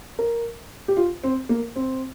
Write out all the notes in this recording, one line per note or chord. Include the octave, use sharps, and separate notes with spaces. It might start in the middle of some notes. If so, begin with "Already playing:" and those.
A#4
G4
F4
C4
A#3
C4